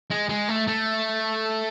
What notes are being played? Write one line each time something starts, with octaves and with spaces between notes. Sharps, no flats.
G#3
G#3
A3
A3